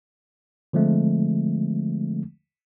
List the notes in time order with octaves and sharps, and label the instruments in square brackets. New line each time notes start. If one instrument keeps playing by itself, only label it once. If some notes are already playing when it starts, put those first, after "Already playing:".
[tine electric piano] D3 F3 G#3 A3 C4